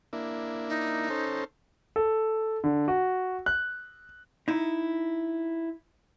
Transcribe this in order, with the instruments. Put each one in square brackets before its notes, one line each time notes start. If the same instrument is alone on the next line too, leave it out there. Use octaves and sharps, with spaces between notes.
[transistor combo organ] A#3 D4 E4
[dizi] D#4
[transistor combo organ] C#4 A4 C5
[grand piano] A4
D3
F#4
F#6
[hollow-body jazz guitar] D#4 E4